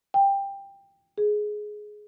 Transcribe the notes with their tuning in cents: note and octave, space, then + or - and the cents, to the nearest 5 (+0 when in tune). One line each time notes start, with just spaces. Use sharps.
G5 +15
G#4 +15